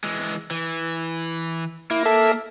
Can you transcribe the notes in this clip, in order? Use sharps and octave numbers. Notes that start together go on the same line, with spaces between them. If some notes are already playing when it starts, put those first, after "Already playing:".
E3 G#3
E3
A#3 E4
A4 E5